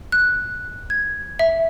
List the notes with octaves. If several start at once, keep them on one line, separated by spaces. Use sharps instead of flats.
F#6
G#6
E5